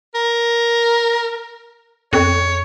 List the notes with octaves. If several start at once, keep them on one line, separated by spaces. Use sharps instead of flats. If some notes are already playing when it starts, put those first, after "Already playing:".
A#4
F2 C#5